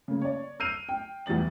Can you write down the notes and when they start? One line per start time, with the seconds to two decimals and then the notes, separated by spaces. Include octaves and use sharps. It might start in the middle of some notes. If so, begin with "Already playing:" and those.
0.08 C#3 A#3
0.21 C#5 D5
0.60 E6 F6 G6 C7 D#7 F7
0.89 G5
1.26 E2 E3 G3 A6 F#7